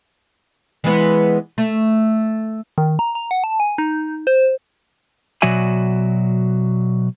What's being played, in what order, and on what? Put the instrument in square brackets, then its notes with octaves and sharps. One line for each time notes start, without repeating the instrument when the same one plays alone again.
[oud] E3 G#3 B3
A3
[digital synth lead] D#3
A#5
A#5
F#5
A5
G#5
D#4
C5
[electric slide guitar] B2 F#3 F#4 D5 E5 G#5